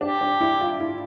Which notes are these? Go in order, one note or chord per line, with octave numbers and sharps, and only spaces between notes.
D4 G4
D4
E4
F4
E4